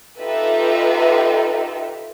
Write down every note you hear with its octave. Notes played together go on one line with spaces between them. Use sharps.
D#4 F4 G4 A4 B4 E5